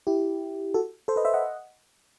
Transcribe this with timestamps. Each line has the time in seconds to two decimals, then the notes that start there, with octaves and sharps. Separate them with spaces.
0.07 E4 G4
0.74 F#4 A4
1.08 A4 C5
1.16 B4 D#5
1.25 C5 E5
1.34 D#5 F#5